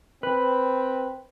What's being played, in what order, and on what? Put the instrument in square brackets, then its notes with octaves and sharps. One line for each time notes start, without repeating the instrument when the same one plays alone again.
[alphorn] C4 [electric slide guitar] B4